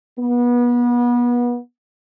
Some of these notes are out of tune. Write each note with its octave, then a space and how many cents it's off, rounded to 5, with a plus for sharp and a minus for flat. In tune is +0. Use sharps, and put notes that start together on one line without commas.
B3 -30